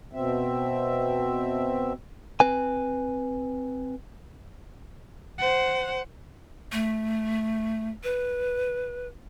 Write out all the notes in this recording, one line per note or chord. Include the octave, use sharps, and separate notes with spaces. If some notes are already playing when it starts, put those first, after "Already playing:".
B2 C4 E5
C4 B4 G#5
C5 F#5
A3
B4